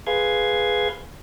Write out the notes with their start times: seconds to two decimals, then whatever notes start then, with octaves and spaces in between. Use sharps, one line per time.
0.07 G#4 B4 F5 C6 G#6